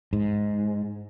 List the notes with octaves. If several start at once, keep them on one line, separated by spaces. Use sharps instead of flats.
G#2